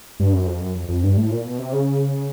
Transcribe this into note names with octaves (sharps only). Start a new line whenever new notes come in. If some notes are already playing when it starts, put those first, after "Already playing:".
G2
F#2
F2
F#2
F2
F2
G2
A2
A#2
B2
C3
C#3